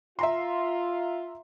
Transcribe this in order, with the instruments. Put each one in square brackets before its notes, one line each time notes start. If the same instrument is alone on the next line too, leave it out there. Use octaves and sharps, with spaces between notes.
[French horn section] F4 [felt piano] E5 A#5 C6